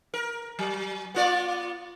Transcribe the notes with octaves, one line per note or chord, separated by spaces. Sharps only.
A#4
F#3
B3 F4 D5